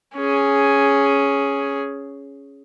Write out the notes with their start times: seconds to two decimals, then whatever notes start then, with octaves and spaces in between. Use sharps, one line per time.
0.15 C#4 G#4